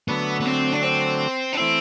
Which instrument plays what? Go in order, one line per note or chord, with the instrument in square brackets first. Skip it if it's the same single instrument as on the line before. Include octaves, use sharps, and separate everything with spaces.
[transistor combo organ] D3 F#3 A3 [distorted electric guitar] B3
[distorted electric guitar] B3
C4
D4
C4
D4
[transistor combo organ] E3 A3 E4 [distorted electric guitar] C4